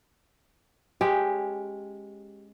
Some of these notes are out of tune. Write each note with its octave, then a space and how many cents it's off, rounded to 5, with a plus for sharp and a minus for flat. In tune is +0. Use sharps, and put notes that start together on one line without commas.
G#3 +0 C#4 -15 G4 +0